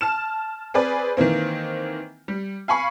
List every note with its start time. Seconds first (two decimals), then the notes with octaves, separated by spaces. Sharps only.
0.01 A5 F6 E7
0.74 C4 G#4 B4 D5
1.17 D#3 E3 A#3 C4
2.28 G3
2.68 F5 G#5 B5 C#6